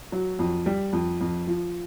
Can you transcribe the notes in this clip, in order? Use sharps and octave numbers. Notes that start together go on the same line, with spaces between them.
F#3
F2
G3
F2
F2
F3